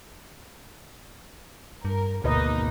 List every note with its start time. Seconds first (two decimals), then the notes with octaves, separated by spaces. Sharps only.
1.85 G2 A#4
2.24 G#1 D2 B2 A#3 D#4 B4 D#5